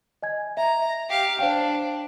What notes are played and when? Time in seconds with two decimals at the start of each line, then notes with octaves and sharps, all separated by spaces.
0.23 D#5 G#5 G#6
0.57 E5 A#5
1.09 G4 F5
1.39 D4 C5 F5 G5
1.75 D7